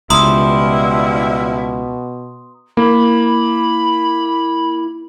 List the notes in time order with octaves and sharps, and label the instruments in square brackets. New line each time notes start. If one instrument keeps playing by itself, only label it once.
[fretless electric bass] C#2 [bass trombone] B2 [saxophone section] F3 G3 E4 [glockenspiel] A#5 C6 D#6
[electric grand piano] A#3 [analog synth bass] E4 [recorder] B5